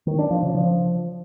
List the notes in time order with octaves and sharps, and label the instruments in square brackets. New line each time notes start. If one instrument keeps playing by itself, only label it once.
[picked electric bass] D#3
D4
F3
C#3
F3